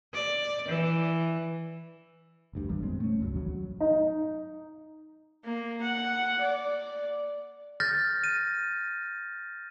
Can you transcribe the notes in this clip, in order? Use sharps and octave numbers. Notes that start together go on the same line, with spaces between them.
D5
E3
F1 D2 G2
D#1 G#1 E2 G3
F2 A#2 G#3 C4
A3 C#4
C#2 G2 F#3
E1 A1 D#2 F#3
D#4
A#3
F#5
D5
F6 G6 A6 A#6
D#7